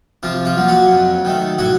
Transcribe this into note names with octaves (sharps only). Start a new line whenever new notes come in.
C3 F3 F4
F3 F4
F#3 A#3
F#3 F#4
F2
D#3 A3
A2 F#3 F#4